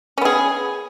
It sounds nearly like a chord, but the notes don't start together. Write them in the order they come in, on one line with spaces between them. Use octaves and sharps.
C#4 B3 G#4